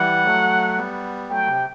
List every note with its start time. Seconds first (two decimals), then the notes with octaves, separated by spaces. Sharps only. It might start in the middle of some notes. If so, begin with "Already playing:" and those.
Already playing: E3 G3 F#5
0.25 F#3 A3
0.77 G3 B3
1.30 F#3 A3 G5
1.47 C3